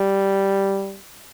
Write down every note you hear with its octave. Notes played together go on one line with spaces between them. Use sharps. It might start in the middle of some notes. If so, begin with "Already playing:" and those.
Already playing: G3